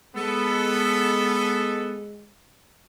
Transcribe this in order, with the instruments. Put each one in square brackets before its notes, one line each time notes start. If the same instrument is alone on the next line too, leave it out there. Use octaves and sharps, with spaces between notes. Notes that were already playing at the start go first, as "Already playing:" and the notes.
[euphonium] G#3 [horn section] B3 A4